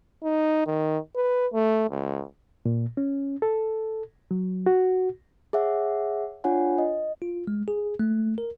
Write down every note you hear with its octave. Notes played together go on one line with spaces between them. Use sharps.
D#4
D#3
B4
A3
C#2
A#2
C#4
A4
F#3
F#4
G#4 C#5 E5 F#5
D4 F4 C#5 F#5 G#5
D#5
F4
G#3
G#4
A3
A#4